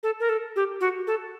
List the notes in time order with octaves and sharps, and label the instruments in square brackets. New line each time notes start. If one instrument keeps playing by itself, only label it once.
[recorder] A4
A#4
A4
G4
F#4
A4